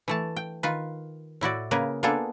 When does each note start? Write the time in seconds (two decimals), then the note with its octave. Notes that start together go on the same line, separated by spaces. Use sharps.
0.08 E3 A3 A5
0.36 G5
0.63 D#3 F4 B4
1.41 A2 E4 F#4 D5
1.71 C#3 A#3 G#4 A#4 B4
2.03 A#3 B3 D4 F4 G#4 A4